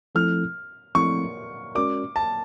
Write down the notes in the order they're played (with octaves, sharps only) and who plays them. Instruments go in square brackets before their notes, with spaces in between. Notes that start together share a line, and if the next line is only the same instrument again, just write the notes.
[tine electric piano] F3 A3 C4 E4 A4 [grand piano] F6
[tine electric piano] F3 A3 C4 E4 A4 [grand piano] C#6
[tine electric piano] G#3 C#4 F#4 A#4 D5 [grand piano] D6
[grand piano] A5